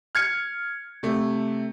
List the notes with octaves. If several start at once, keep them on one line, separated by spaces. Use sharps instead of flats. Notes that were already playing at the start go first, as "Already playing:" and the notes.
F6 G#6 C#7
C3 A3